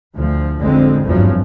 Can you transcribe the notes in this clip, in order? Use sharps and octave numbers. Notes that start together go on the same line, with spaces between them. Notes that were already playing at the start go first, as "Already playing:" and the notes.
D2 F3
A1 F2 D3 G#3 C4
G#1 E2 G2 F3 F#3